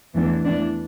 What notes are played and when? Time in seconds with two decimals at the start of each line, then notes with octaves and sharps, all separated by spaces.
0.15 E2 E3 A3 D4
0.44 E3 A3 D4